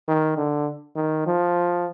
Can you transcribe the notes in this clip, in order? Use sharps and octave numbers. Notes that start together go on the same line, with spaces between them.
D#3
D3
D#3
F3